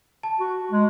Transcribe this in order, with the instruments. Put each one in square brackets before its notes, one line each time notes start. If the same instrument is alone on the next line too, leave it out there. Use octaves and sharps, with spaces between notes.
[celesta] A5
[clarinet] F#4
G#3